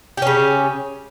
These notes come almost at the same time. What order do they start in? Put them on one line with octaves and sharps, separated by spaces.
G4 C#4 C#3